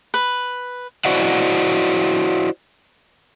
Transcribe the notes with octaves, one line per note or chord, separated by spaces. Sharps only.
B4
E4 F#4 C5 D5 D#5 F#5